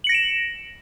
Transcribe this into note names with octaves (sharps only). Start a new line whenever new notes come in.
A#6 C#7 D7 E7 F#7